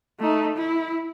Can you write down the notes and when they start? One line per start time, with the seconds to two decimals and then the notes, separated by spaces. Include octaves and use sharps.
0.20 A3 D#4
0.56 E4